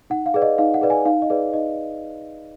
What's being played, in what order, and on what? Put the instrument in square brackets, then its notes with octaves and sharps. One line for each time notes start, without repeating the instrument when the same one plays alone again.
[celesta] D#4 F#5
F5
G#4 B4 D5
D#5
D#4 F5
F#5
G#4 B4 D5
G#5
D#4 F5
D#5
G#4 B4 D5
D#4 D#5